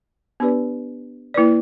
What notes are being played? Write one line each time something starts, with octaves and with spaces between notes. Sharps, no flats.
B3 D4 G4 B4 D5
A#3 E4 B4 D5